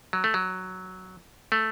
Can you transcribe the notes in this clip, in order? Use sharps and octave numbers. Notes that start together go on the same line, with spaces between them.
F#3
A3
F#3
A3